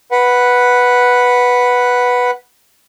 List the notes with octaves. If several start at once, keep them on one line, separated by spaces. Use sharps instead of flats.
B4 F#5